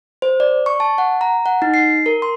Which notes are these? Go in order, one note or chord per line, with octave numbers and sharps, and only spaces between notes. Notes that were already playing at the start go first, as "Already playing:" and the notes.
C5
D5
C#6
A5
F#5
A#5
F#5
D#4
C7
A#4
C6